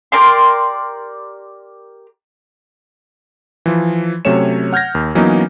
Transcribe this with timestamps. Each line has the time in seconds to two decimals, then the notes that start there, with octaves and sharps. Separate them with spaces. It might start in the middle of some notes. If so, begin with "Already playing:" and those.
0.12 G4 A#4 D5 C6
3.66 E3 F3
4.25 C3 F#3 A3 C#4 C#5 E7
4.73 F#5 F6 G6 G#6 A#6
4.95 D#2
5.15 E3 F#3 A#3 B3 C#4 D#4